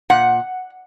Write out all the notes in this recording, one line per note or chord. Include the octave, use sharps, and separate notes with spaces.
A#2 F#5